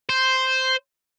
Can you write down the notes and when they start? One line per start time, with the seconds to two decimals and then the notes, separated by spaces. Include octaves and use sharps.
0.09 C5